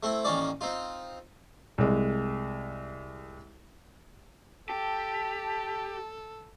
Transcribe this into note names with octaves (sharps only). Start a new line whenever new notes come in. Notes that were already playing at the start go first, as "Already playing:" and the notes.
A3 C4 E4
A1 D#3 A#3 C#4 D5
C4 D#4 F4
C2 G#3
G4 A4 A5